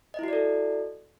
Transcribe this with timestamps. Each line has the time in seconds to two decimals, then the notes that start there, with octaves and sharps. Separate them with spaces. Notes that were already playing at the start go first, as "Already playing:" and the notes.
0.14 D#5
0.19 E4
0.23 F#4
0.28 D5
0.33 A4